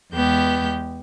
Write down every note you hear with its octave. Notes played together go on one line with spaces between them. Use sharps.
E2 G#3 B3 G4 G6